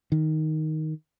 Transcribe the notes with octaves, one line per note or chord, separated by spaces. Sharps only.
D#3